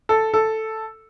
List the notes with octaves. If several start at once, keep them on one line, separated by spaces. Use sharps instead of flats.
A4
A4